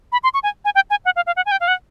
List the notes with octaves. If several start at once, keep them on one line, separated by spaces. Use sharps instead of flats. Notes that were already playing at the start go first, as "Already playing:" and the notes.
B5
C6
C#6
G#5
G#5
G5
G#5
F#5
F5
F5
F#5
G#5
G5
F5
F#5